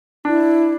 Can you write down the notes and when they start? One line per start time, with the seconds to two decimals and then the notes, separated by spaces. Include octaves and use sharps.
0.25 D4 E4